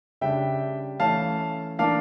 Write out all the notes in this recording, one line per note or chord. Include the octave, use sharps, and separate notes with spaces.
C#3 G3 D4 E5 G5
E3 A3 C#4 F5 A5
E3 A#3 D4 F5 A5